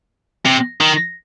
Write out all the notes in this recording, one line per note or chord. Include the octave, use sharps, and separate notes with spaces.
C3
D#3